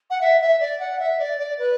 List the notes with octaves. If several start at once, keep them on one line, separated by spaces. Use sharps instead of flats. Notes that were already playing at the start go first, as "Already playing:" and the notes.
F#5
E5
E5
D5
F#5
E5
D5
D5
B4